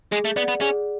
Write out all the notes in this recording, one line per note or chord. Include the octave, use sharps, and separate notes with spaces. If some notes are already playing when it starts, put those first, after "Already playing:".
G#3 G#4
A3
B3 D5 F#5
B3
C#4 G#4